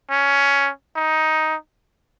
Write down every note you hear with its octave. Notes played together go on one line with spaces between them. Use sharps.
C#4
D#4